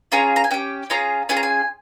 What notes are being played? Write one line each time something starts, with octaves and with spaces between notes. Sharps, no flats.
C#4 F4 G#4 A#5
A#5
G#5
C#4 G4 G5
C#4 F4 G#4 A#5
C#4 F4 G#4 G#5
A#5
G#5